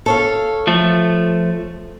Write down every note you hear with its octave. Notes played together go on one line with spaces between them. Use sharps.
A4 C#5 F5
F3 A3